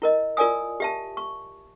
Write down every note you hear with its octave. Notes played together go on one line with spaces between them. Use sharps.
E4 A#4 D#5
F4 A#4 D5 G#5 D#6
G4 E5 A5
C#6